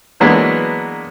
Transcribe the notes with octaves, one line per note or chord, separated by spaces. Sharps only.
E3 F#3 G#3 A#3 B3 D4